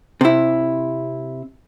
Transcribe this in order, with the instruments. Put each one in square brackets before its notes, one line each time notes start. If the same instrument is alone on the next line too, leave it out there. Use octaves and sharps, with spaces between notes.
[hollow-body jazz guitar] C3 E4